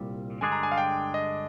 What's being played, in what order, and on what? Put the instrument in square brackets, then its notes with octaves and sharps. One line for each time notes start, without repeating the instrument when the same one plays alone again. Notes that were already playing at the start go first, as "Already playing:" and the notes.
Already playing: [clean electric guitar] C2 A#2 G3
[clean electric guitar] G2 D3 G#3 D4 G#4 [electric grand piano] G#5
[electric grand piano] A#5
G#5
F5
G5
D#5